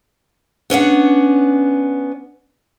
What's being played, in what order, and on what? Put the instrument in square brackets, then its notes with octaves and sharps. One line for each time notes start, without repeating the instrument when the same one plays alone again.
[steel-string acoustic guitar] B3 C#4 D4 F#5